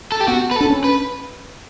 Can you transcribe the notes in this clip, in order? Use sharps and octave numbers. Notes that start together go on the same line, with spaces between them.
A4
G4
B3 F#4
B4
A4
D4
C#4
B4